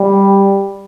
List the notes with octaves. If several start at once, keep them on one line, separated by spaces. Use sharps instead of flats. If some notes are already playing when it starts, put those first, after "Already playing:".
Already playing: G3